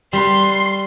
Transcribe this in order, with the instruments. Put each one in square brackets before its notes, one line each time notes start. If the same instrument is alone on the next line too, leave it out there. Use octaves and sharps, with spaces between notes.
[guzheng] G3 B4 [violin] C6